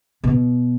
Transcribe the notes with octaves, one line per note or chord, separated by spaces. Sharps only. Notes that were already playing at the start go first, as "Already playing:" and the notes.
B2